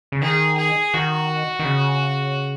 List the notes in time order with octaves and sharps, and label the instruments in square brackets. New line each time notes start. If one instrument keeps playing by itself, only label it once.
[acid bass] C#3
[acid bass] D#3 [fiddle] G#4
[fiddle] G#4
[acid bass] D#3 [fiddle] F#4
[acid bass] D#3
C#3